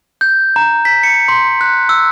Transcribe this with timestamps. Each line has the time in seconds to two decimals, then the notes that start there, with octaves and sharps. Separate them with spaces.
0.21 G6
0.56 A#5
0.85 B6
1.03 C#7
1.28 C6
1.61 F#6
1.89 E6